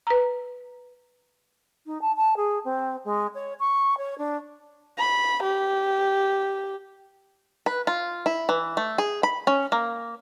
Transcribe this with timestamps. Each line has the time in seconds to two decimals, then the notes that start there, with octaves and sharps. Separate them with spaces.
0.07 B4 A#5
1.86 D#4
2.01 A5
2.17 A5
2.36 G#4
2.64 C4
3.04 G#3
3.34 C#5
3.59 C#6
3.97 C#5
4.18 D4
4.98 B5
5.43 G4
7.66 B4
7.87 F4
8.26 E4
8.49 E3
8.77 A3
8.98 G#4
9.23 B5
9.47 C#4
9.72 A#3